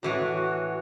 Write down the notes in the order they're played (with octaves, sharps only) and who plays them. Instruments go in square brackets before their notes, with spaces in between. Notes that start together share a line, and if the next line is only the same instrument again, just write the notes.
[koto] A2 E3 C#5 [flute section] F#4